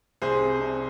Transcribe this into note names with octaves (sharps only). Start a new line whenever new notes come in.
C2 G#4 C5
C3
C3